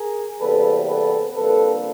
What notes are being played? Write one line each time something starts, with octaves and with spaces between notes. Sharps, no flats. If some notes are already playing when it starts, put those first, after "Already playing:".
Already playing: G#4 A#4
E2 C3 E3 G3 A#3 A4 B4
A4 B4
F2 D3 G3 A#3 A4 B4